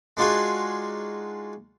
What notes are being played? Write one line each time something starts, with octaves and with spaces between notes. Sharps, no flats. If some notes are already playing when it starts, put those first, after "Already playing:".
G#3 D4 D#4 F4 F#4 G#4